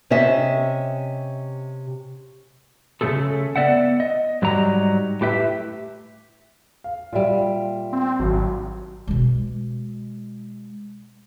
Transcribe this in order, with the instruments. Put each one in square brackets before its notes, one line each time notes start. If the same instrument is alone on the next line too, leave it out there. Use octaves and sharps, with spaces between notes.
[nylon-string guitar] C3 C#4 D#5 E5
[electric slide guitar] C#3 F#3 A3 G#4 A4
B3 D5 E5 F#5
D#5
G#2 F#3 G3 G4 D#5 A#5
A2 G4 B4 E5
[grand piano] F5
[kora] A#2 G3 [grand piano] F4 E5
[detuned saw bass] C4
[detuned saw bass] G#1 [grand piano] F#3
[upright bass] B2 G#3